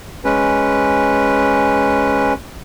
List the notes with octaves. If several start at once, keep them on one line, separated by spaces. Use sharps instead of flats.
G#3 C#4 B4